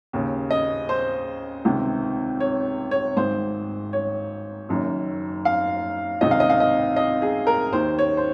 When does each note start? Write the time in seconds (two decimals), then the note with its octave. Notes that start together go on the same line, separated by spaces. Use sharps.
0.13 D#2 C#3
0.51 D#5
0.89 C5
1.65 C#2 C3 D#3
2.40 C#5
2.91 C#5
3.17 G#1 G#2 D#3 C5
3.93 C#5
4.69 F#1 F#2 D#3
5.45 F5
6.21 C#2 C3 D#3 D#5
6.31 F5
6.40 D#5
6.50 F5
6.60 D#5
6.96 D#5
7.22 G#4
7.47 A#4
7.72 D#2 D#3 C5
7.99 C#5
8.17 C5